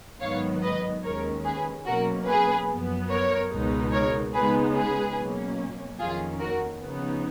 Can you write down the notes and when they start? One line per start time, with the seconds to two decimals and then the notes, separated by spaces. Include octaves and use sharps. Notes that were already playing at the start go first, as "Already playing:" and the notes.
0.21 G#2 D#3 F#3 B3 C#5 F5
0.63 B4 D#5
1.04 D#2 D#3 G#3 C#4 A#4 C#5
1.45 G#4 B4
1.86 B2 F#3 A#3 C#4 F#4 A#4
2.27 G#4 B4
2.69 F#2 F3 B3
3.10 A#4 C#5
3.51 C#2 B2 G#3 B3 D#4
3.93 A#4 C#5
4.34 C#3 G#3 B3 D#4 G#4 B4
4.75 G#4 B4
5.16 B2 F#3 A#3 C#4
5.99 F2 D#3 A#3 C#4 F4 G#4
6.40 F#4 A#4
6.81 C#3 F3 B3 D#4